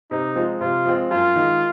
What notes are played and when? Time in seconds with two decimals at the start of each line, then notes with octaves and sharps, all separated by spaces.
0.11 C3 D#4
0.36 F3 G#3 C4
0.61 C3 F4
0.85 F3 G#3 C4
1.11 F#2 F4
1.36 D#3 G#3